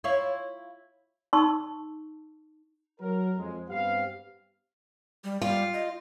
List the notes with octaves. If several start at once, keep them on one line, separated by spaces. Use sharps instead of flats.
E4 F4 C#5
D#4 A5 C6 C#6 E6
F#3 A#4
F2 G#3
G2 G3 B3 C4 G4 F5
G3
G3 F4
D#5